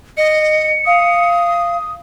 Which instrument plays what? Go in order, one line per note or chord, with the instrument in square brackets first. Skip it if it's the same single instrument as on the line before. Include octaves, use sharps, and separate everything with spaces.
[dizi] D#5 [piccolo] C#7
[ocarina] F5 [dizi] D#6